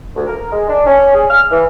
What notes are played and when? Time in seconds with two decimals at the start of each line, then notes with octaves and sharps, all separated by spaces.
0.15 D2
0.27 A#4
0.52 G#3
0.68 D4
0.87 C#4
1.14 G#4
1.29 F6
1.51 E3